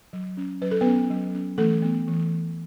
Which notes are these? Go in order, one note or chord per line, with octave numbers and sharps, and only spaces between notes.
F#3
C#4
F#3 B4
A4
B3 C#4 B4
F#3
C#4
E3 A3 A4
B3
E3